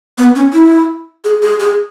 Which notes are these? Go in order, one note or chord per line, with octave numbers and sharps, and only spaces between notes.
B3
C#4
E4
G#4
G#4
G#4